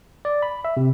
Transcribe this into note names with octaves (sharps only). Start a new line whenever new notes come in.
D5
B5
E5
C3